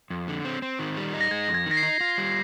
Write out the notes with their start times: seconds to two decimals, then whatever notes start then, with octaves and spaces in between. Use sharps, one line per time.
0.10 F2
0.28 D3
0.45 C4
0.62 C4
0.79 D#3
0.97 G3
1.14 D#4
1.21 A#6
1.31 G#3 G#6
1.49 F2
1.54 G#6
1.66 D#3
1.71 A#6
1.77 C7
1.83 D#4
2.01 F4
2.18 G3